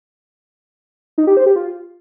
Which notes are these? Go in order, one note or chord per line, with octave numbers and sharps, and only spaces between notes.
D#4
G4
C5
G4
F4